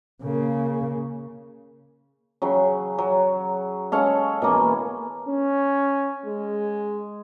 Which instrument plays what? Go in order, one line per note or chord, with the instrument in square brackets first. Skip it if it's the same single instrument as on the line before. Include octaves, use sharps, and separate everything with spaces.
[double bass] C#3 A#3
[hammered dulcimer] C#3 F#3 G5
F#3
G#3 C#4 A4 F5
B2 E3 A#3 C#4
[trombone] C#4
G#3